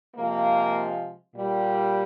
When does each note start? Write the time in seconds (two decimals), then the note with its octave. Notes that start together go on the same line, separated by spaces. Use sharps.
0.15 C3 F3 G#3 A#3
1.34 A#2 G3